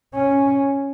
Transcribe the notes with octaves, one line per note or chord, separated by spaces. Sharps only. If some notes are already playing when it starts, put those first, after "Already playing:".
C#4